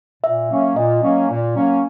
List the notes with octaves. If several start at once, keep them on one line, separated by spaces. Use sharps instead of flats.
A#2 E5
F#3 A#3 C#4
A#2 D#5
F#3 A#3 C#4
A#2
F#3 A#3 C#4